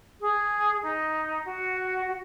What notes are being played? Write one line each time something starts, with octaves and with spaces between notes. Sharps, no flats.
G#4
D#4
F#4
F#4